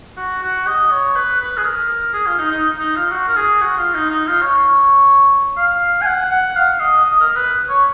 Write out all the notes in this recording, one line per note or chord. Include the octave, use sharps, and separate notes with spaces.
F#4
F#4
D#5
C#5
B4
B4
G#4
A#4
G#4
F4
D#4
D#4
D#4
F4
F#4
A#4
G#4
F#4
F4
D#4
D#4
F4
C#5
F5
G#5
F#5
F#5
F5
D#5
D#5
A#4
B4
C#5